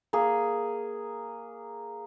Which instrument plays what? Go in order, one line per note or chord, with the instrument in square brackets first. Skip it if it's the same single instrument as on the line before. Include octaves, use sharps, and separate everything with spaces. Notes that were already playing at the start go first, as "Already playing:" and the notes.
[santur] A#3 G#4